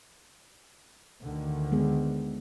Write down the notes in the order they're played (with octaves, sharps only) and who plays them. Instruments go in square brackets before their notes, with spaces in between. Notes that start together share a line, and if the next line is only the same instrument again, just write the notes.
[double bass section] D2 D3 D#3
[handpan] G#3 B3 G#4